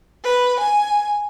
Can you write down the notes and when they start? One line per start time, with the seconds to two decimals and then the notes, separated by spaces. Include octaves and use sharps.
0.24 B4
0.59 G#5